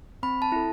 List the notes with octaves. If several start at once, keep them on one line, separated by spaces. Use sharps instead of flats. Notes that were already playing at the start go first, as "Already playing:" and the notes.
C4 B5
A5
E4 A4